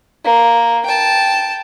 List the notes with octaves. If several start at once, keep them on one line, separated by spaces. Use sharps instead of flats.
A#3
G5 A5